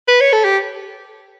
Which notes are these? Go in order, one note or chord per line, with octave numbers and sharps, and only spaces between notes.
B4
C#5
A4
G4